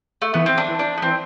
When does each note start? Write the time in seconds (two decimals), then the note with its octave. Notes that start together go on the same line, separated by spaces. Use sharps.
0.22 A3
0.34 E3 B3
0.46 C4
0.58 D4
0.68 E3
0.79 D4
0.98 B3
1.02 E3 C4